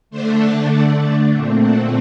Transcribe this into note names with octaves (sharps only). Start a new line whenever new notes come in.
D3 A3 D4 C5
D5
F#5
D5
A#2 A3 C4
F#5